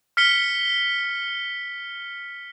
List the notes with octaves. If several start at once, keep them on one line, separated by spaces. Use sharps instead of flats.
F6 B6 C#7 G7